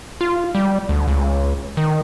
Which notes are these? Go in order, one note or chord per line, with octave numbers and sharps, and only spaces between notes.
F4
G3
D2
C#2
D#3